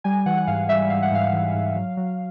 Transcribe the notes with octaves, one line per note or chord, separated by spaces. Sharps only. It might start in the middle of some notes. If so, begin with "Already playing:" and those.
G3 G#5
E3 F#5
F#5
G#2 F5
G3 E5
G#2 F5
F#5
G#2 F5
E3
G#2
F#3
F#3